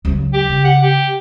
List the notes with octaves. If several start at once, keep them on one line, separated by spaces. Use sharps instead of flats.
C#2 F#3
G4
C#3
F#5
G4